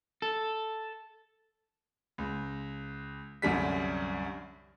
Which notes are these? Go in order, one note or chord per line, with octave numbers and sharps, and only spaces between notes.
A4
C#2
C2 F#2 D3 G3 B6